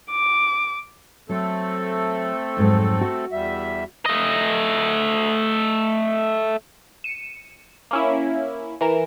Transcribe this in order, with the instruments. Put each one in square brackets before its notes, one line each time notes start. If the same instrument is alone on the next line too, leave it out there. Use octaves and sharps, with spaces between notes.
[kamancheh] D6
[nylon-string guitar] F#3 [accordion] A3 C4 A4
[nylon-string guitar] F2 G#2 F#3
F#4
[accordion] E2 G3 E5
[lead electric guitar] A3 D#5
[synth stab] C#7 D#7 E7
A#3 C#4 E4
E3 A#4 E7